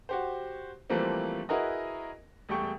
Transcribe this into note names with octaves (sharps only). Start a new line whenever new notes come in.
F#4 G4 C5
E3 F3 G3 A3 A#3 C4
E4 F#4 G#4 A#4 B4 D#5
E1 G3 A3 G5 C#6